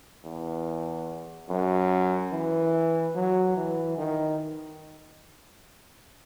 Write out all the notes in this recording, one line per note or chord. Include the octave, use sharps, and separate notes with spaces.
E2
F#2
E3
F#3
E3
D#3